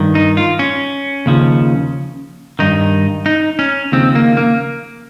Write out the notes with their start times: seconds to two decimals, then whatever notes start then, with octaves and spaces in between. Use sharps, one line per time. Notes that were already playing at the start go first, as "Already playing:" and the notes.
Already playing: G2 D#3
0.15 D#4
0.37 F4
0.59 C#4
1.26 D#2 C#3 F3
2.59 G2 D#3 D#4
3.26 D#4
3.59 C#4
3.92 D#2 C#3 F3 C4
4.15 A#3
4.37 A#3